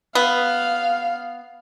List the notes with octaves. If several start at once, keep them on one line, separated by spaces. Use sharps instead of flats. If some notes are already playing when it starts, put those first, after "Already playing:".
B3 F5